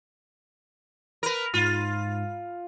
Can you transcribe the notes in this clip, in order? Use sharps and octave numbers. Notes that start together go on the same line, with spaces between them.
A#4 B4
G#2 F4